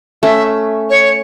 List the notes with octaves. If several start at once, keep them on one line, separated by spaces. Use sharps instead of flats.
A3 C#4 E5
C#5